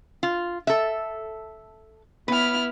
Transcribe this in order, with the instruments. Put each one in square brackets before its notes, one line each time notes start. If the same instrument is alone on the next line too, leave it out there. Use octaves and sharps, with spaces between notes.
[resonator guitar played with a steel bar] F4
A4 E5
[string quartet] B3 E4 F6 [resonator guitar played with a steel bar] B4